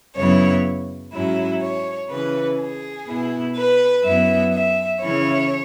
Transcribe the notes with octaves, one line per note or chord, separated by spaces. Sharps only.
F#2 C#3 F#3 B3 E4 C#5
G#2 F#3 C#4 E4
C#5
C#3 E3 C#4 B4
G#4
B2 B3 E4
B4
F#2 F#3 B3 E4 E5
E5
C#3 E3 C#4 E4 C#5